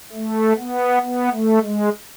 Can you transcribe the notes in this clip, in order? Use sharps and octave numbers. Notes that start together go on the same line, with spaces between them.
A3
B3
B3
A3
G#3